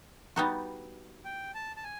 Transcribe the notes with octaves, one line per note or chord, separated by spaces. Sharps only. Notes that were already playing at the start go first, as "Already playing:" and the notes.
G3 B3 D#4 F#4
G5
A5
A5
G#5